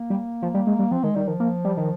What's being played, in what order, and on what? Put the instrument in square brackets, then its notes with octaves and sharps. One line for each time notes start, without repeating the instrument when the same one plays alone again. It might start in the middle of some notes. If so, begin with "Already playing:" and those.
Already playing: [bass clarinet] A#3
[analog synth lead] G3
F3
G3
G#3
G3
[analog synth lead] F3 [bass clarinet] C4
[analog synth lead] D#3 [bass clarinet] G#3
[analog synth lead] D#3 [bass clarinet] G3
[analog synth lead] D#3 [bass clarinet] F3
[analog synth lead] A#3
G3
D#3